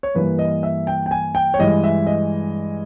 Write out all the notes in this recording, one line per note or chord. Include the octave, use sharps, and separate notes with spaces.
C#5
G2 E3 A#3 B4
D#5
E5
G5
G5
G#5
G5
C#5
G2 E3 G#3 D#5
E5
D#5